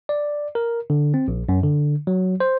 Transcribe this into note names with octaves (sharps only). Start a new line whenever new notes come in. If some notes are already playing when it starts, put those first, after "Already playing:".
D5
A#4
D3
C4
A#1
F#2
D3
F#3
C5